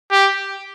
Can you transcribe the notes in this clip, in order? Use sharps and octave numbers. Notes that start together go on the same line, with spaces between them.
G4